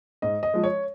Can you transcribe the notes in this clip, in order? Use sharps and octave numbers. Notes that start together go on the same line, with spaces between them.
G#2 D#5
D#5
F3 G#3
C#5